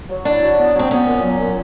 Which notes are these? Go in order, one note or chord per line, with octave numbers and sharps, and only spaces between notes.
F#3
D4 E4
F#3
B3
F#3 C4
B3 C#4
A#2
F#3
A#2